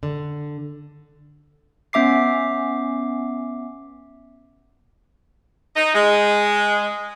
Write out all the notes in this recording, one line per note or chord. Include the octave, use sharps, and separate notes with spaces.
D3
B3 C#4 E5 D6 C7
D#4
G#3